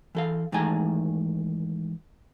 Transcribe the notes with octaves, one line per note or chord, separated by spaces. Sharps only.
E3 A4 F5
G#2 D#3 E3 A3 G#5 A#5